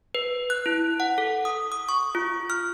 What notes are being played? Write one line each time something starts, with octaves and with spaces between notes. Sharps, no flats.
B4
F#6
E4
F#5
A4
D#6
D#6
C#6
F4
F6